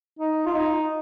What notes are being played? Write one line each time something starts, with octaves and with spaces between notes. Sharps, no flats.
D#4
F4
D#4